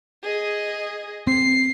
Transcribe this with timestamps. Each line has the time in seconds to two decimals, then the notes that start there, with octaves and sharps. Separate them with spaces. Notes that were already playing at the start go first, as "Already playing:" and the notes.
0.23 G#4 D#5
1.27 C4 C7